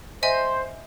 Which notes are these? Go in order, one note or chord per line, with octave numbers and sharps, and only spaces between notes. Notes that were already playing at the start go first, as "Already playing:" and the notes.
C5 D#5 E5 G#5